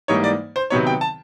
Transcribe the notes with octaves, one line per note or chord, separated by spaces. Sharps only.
G#2 E3 G3 A#3 D#4 C#5
D5
C5
C3 D#3 F#3 B3 D#4 C#5
G5
A5